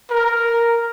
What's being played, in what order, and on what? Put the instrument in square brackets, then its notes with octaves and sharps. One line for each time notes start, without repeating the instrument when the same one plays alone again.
[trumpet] A#4